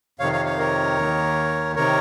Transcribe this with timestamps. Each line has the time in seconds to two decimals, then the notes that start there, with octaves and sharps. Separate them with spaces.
0.20 F2 C3 D#3 C#5 F5
0.33 C#5 F5
0.45 C#5 F5
0.59 A#4 C#5
0.97 D#2 D#3
1.76 C3 D#3 A#4 C#5